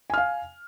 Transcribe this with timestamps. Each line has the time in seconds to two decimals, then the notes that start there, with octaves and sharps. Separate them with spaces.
0.10 G#5
0.14 F6
0.18 F5